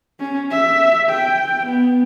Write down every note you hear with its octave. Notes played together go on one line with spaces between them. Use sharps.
C#4
E5
G5
B3